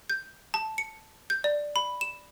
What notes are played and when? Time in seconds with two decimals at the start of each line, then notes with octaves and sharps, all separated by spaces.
0.10 G6
0.54 A5
0.78 C#7
1.30 G6
1.44 D5
1.76 B5
2.01 E7